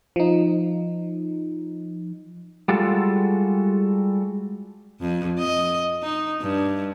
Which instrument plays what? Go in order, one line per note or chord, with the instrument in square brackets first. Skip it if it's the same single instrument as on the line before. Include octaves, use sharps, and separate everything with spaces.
[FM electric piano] F3 D#4
[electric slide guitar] G3 G#3 F4 F#4 A4
[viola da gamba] F2
D#5
D#4
G2